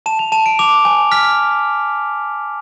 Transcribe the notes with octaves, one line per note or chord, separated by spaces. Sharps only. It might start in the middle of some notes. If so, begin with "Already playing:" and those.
A5 E7
F7
A5 E7
D7
D6 F7
G#5
F6 B6